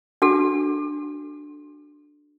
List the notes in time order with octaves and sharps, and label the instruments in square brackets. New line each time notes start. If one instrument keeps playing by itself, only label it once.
[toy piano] D4 F#4 A4